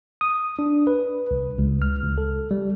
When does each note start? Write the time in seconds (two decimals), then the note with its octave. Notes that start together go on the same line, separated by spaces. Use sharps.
0.21 D#6
0.59 D4
0.87 B4
1.31 C2
1.58 C#2
1.82 F6
2.03 C#2
2.18 A4
2.51 G3